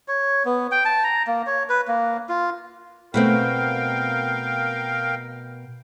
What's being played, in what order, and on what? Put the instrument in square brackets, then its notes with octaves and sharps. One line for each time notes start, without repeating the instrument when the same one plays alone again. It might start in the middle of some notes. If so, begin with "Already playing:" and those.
[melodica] C#5
B3
G5
A5
A#5
A#3
C#5
B4
A#3
F4
[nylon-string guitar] B2 A3 C4 [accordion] A#4 F5 G5